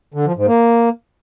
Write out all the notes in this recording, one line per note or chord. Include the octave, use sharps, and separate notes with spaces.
D3
F3
G#2
A#3